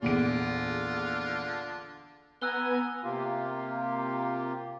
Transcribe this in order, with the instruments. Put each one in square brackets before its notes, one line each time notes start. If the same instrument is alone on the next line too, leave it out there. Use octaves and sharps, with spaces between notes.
[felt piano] A#1 E2 D7 [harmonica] D3 D4 F4
[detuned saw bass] B3 [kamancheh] G#5 A#5 [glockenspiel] E6 F#6 G7
[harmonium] C3 A#3 F4 G4